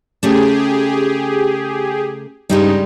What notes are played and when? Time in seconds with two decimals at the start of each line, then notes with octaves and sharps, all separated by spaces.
0.23 C#3 A3 G4 G#4
2.50 G2 C#3 G3 G#3 D#4 G4